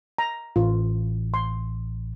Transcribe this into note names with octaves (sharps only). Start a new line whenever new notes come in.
A#5
A1 F4
C6